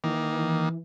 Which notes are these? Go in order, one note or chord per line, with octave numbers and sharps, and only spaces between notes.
D#3 E3 A#3